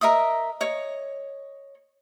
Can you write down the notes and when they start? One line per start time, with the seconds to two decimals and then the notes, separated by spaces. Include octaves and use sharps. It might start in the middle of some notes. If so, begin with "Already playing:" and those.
0.01 A#4 D#5 E5 D#6
0.61 C#5 D#5